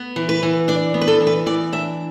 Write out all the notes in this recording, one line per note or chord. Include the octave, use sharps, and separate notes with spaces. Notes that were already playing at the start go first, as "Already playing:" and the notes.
Already playing: B3
E3
B4
E3
D4 D5
B3
B4
A4
E3
B4
E3 D5
D4 E5